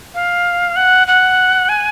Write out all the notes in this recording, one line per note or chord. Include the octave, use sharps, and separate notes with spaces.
F5
F#5
F#5
G#5